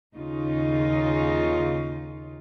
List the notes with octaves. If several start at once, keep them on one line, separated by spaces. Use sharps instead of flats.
D#2 C#3 D#4 F4